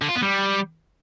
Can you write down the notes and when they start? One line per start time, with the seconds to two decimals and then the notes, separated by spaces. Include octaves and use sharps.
0.01 D3
0.08 F4
0.15 B3
0.22 G3